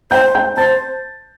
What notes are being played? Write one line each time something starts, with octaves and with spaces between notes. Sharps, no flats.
C5 G5 G6
G5 G6
C5 A5 A6